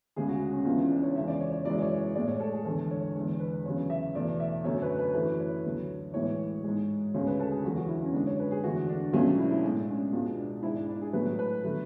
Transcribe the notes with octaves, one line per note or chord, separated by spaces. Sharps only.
D2 C#3 G#3 G#4
F#4
C#4
C#2 C#3 E3 G#3 D4
C#4
D4
C#5
E2 C#3 G#3 E5
D5
C#5
C#5
F#2 E3 G#3 D5
C#5
D5
A2 G#3 D5
C#5
A4
G#4
E2 D3 G#3 A4
C#5
E2 D3 G#3
B4
E2 C#3 F#3 C#5
E5
E2 B2 A3 D5
E5
F#2 D3 A3 C#5
B4
B4
F#2 E3 A3 B4
C#5
D2 D3 F#3
A2 E3 G#3 C#5
G#2 G#3
D2 C#3 G#3 C#5
B4
A4
G#4
E2 D3 F#3 F#4
F#4
E4
C#4
F#2 D3 G#3 D4
C#5
B4
G#4
E2 D3 A3 F#4
D4
C#2 B2 F#3 A3 C#4
D4
E4
E4
A2 G#3 D4
C#4
C#2 B2 G#3 D4
D4
G#2 G#3 E4
D4
D4
G#4
A2 F#3 A3 B4
B4
D3 F#3 A3